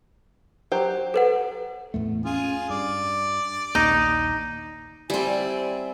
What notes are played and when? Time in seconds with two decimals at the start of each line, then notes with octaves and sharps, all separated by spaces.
0.72 F#3 G4 C5
1.14 A4 B4 F#5
1.94 E2 A2 A3
2.25 C#4 F4 G#4
2.70 G2 D5
3.75 A#1 D#2 A#3 D#4
5.10 G3 C4 E4 D5 G#5